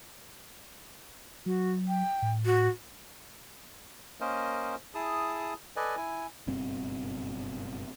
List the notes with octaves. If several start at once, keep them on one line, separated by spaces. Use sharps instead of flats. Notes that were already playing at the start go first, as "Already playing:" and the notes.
F#3 F#4
G5
A2
F#4
A#3 C#4 A#4 C5 D#5
E4 G#4 A5 D#6
A4 B4 D5 D#5 G#5
E4 G#5
F#1 G2 B2 C4